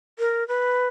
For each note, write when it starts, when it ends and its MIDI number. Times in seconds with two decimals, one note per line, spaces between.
0.19 0.46 70
0.48 0.88 71